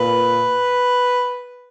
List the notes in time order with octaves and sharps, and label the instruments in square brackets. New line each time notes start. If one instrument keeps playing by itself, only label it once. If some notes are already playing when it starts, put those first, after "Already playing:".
Already playing: [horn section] A#2 B4